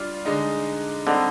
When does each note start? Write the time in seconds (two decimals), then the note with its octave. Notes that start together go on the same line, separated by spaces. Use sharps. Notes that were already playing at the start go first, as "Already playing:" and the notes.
Already playing: G3 D4 F4
0.25 D3 G#3 D#4
1.06 D3 G3 C4 D#4 G4